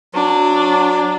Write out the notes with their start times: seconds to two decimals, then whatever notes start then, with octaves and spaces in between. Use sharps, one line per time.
0.14 F#3 D4